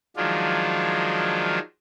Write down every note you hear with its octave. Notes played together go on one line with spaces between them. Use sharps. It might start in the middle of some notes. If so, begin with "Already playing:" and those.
D#3 F3 F#3 G#3 D4 F4